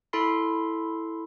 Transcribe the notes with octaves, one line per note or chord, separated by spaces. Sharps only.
E4 A4 B5 C6 C7